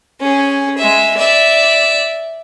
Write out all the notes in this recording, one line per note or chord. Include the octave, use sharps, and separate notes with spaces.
C#4 G#4
G#3 E5
D5 E5